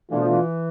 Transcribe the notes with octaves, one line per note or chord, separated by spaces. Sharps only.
B2 E3 A3 D4 F4
F3
E3